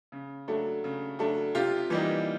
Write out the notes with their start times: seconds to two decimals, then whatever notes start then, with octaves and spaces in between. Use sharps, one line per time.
0.12 C#3
0.48 F#3 A3 D4
0.84 C#3
1.19 F#3 A3 D4
1.55 C3 F4 G4
1.90 E3 G3 A#3 D#4